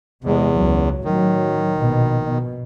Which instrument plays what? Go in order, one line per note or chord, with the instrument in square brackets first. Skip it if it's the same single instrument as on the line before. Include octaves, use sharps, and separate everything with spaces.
[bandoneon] E2 [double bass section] C3 G#3
[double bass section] C#2 F#3
[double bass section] A1 F#3 [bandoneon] D#3
[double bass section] A#1 B2
B2